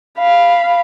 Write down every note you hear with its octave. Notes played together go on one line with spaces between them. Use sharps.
F5 B5